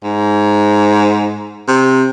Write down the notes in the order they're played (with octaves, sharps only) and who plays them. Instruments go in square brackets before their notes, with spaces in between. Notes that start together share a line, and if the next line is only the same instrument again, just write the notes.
[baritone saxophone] G#2
C3